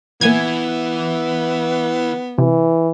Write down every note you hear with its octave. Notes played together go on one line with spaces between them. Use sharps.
A#2 E3 B3 E4 G#5 G#6
C3 E3